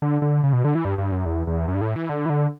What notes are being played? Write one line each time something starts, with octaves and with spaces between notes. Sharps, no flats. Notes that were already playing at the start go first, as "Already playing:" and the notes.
D3
D3
C#3
B2
D3
E3
G2
G2
F#2
E2
E2
F#2
G2
A2
E3
D3
E3
D3